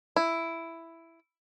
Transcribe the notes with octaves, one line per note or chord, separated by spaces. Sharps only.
E4